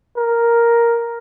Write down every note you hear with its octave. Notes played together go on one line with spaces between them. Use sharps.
A#4